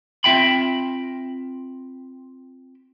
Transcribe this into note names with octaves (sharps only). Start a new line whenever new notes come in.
C4 F4 E5 G5 B5